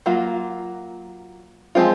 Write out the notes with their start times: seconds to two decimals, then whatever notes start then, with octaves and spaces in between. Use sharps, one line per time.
0.06 F#3 A#3 F4
1.75 F3 G#3 C4 F4